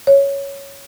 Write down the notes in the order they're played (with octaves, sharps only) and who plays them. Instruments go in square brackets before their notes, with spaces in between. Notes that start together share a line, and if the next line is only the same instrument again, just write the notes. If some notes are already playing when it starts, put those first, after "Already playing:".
[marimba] C#5